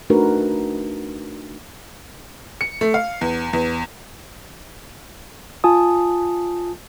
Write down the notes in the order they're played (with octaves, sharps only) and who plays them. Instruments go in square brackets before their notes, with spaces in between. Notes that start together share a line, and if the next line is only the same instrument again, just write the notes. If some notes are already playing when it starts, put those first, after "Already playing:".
[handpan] A3 D4 D#4 F#4 A#4 B4
[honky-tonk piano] C#7
A3
F5
E2
E2
[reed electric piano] F4 G#5 A5 D#6